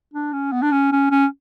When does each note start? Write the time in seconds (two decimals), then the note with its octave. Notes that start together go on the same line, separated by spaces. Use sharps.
0.14 D4
0.33 C#4
0.52 B3
0.62 D4
0.72 C#4
0.92 C#4
1.11 C#4